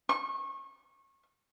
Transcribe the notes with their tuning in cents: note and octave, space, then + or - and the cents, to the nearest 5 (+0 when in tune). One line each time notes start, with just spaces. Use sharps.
C#6 -30